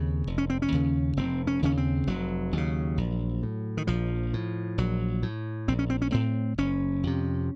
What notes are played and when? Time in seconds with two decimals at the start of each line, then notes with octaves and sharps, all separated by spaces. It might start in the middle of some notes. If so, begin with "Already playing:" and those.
Already playing: D#2 C#3 C4
0.27 F1
0.38 C#4
0.50 C4
0.62 C#4
0.72 D#2 C#3
1.17 F1 C4
1.47 C#4
1.62 D#2 C#3 C#4
1.77 C4
2.07 F1 F#3
2.53 D#2 C#3
2.98 A#1
3.43 A2
3.77 D#3
3.87 A#1 F3
4.33 A2
4.78 A#1 F#3
5.23 A2
5.68 A#1 C4
5.79 C#4
5.90 C4
6.02 C#4
6.12 A2 C4
6.58 F#1 C#4
7.03 F2 C3